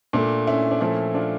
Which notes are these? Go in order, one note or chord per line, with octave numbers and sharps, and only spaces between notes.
A#2 A3 D4
C#4 E4
D4
A#2 F3 A3 C#4 E4
D4 F4